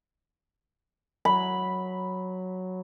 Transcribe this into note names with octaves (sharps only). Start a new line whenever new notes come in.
F#3 B5